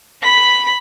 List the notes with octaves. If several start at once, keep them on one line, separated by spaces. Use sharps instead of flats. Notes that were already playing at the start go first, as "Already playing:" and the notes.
B5 B6